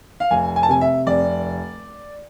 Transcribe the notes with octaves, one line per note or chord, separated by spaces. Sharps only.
F5
F1 G#5
G#5
A5
C3 G#5
E5
F1 D5